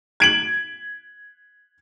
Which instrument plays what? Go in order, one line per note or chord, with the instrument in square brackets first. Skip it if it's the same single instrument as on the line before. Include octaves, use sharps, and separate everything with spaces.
[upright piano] G#6 D7 F#7